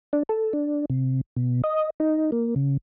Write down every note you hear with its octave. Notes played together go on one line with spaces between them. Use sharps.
D4
A4
D4
C3
B2
D#5
D#4
A#3
C#3